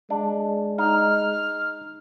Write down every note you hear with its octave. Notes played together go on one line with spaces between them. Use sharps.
G#3 D4
D#4 F6